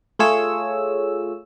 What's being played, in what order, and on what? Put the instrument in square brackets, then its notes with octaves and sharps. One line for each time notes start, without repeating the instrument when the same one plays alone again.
[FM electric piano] A3 F4 G#4 C#5 E6